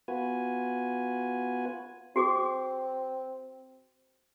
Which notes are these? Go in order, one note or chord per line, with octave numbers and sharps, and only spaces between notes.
B3 F4 F#4 B4 G#5
C4 F#4 G#4 D6